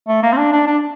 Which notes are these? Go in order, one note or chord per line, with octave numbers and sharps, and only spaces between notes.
A3
A#3
C4
D4
D4
D4